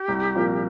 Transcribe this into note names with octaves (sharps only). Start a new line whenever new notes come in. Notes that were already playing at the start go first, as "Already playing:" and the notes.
Already playing: G4
C2
A#2 F3 C4 A#4